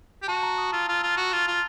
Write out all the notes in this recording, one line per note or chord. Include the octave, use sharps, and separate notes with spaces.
G4
F#4 A5
A#5
D#6
F4 E6
F4 F6
E6
F4
F#4
F4
F4